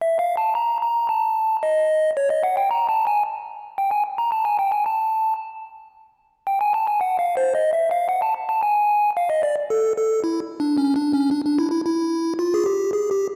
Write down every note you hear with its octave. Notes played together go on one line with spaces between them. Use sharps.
E5
F5
A5
A#5
A#5
A5
D#5
C#5
D#5
F#5
G5
A#5
A5
G#5
G5
G#5
A#5
A5
G#5
G5
G#5
A5
G5
G#5
A5
G#5
F#5
F5
C5
D#5
E5
F5
F#5
A5
A5
G#5
F5
D#5
D5
A4
A4
E4
D4
C#4
D4
C#4
D4
D4
E4
E4
E4
F4
G#4
G4
G#4
G4